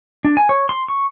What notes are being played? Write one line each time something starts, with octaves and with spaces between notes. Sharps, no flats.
D4
G#5
C#5
C6
C#6